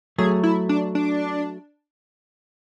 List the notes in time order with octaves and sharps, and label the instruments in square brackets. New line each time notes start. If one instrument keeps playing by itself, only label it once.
[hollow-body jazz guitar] F#3 A3 [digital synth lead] G#4
[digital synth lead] E4
D4
D4